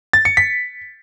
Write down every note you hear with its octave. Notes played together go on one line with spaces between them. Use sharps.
A6
C#7
B6